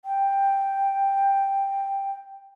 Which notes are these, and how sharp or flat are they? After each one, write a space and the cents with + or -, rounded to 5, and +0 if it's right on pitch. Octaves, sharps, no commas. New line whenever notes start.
G5 +5